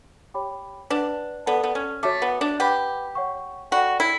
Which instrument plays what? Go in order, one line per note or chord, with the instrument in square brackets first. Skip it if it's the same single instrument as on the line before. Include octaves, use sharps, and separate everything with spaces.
[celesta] G4 C#5 G5 B5 D6
[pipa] D4 [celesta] B4 F#5 A5
[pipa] B3 [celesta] A4 D5 A5
[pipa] B3
C#4
[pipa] A3 [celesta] F#4 C#5 E5 A5 D6
[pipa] B3
D4
[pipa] G4 [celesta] B4 F#5 B5 D6
[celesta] C#5 F#5 C#6
[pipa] F#4 [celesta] A4 D5 G5 B5
[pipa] E4